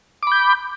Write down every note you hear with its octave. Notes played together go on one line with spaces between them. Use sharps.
B5 D6 G6